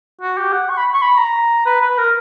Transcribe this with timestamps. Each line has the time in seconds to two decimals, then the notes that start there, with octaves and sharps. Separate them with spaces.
0.21 F#4
0.38 G4
0.53 F#5
0.70 C#6
0.77 B5
0.94 C#6
1.02 B5
1.18 A#5
1.66 B4
1.81 B4
1.98 A#4